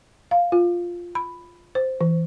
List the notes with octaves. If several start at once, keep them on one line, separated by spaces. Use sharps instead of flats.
F5
F4
B5
C5
E3